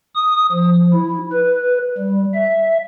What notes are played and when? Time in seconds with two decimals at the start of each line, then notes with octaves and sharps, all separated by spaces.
0.15 D#6
0.52 F3
0.94 E4
1.32 B4
1.98 G3
2.34 E5